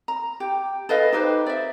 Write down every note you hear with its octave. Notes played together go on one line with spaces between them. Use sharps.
A#5
G4
A4 B4 D#5 F5
D#4 G4 B4 C5
D5 E5